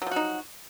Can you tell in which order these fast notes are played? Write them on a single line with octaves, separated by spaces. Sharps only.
F#3 F3 F#4 D#4